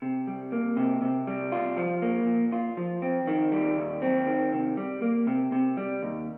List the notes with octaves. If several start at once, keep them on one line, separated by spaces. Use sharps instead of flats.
C3
G3
A#3
C3
C3
G3
F4
F3
A#3
A#2
F4
F3
C4
D#3
G3
D#2
C4
D#3
C3
G3
A#3
C3
C3
G3
D#2